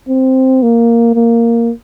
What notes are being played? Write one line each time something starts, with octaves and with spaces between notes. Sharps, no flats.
C4
A#3
A#3